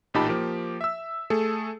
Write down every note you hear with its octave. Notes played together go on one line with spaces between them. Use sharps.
A1 A#2 D#4 G4 A5 B5
F3 A#3 G4
E5 E6
A3 G#4 A4